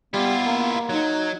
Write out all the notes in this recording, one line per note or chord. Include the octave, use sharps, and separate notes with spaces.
G3 B3 E4 F4
A#3
F#3 D#4